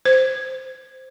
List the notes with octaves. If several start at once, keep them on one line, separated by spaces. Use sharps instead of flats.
C5